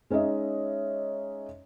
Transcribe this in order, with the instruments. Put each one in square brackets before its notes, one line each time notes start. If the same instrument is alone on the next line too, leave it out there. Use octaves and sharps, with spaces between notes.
[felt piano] G#3 C#4 D#4 D#5 E5